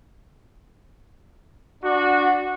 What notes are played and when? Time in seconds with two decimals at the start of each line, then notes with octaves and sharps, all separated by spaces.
1.84 D4 F#4